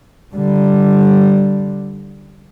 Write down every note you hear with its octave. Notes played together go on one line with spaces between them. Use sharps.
D3 G3